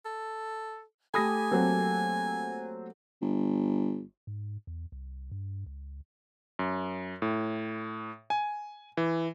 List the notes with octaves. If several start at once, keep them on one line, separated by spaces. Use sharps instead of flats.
A4
A3 G4 A4 G#5 B5 D#6 A#6
F#3 A#3 C4 A4
G1
G#2
E2
C2
G2
C#2
F#2
A2
G#5
E3